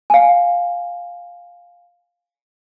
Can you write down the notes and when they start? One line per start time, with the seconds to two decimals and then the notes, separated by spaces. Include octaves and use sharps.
0.10 F5 G#5